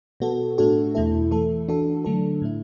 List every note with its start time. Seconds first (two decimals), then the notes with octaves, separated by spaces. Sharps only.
0.20 B2 B3 F#4 A4
0.58 A2 A3 D4 F#4 A4
0.95 E2 B2 A3 E4 A4
1.31 E3 A3 E4 A4
1.68 E3 D4 F#4 A4
2.05 D3 F#3 A3 D4 A4
2.42 A2 A3 E4